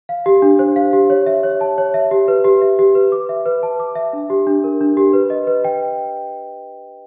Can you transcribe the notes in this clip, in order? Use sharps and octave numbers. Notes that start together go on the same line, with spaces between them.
F5
G4
D4
C5
F5
G4
C#5
E5
C#5
A5
C#5
E5
G4
B4
G4
E5
G4
B4
D6
E5
B4
A5
D6
E5
D4
G4
D4
A#4
D4
G4
B4
D#5
B4
G5